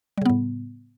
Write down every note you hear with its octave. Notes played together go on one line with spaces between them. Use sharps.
A2 C#3 G3 B3